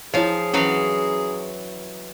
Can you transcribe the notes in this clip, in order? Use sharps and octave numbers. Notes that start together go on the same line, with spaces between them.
F3 E4 G#4 C#5 D#5 F5
E3 F#3 C#4 F5